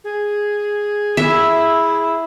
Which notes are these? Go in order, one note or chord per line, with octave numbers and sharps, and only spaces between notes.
G#4
E4 E5